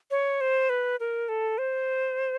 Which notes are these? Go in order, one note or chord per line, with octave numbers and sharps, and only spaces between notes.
C#5
C5
B4
A#4
A4
C5